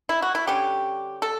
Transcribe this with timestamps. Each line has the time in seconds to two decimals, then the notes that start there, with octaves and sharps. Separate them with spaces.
0.09 E4
0.22 F#4
0.35 E4
0.47 D3 G3 C#4 G4
1.22 A4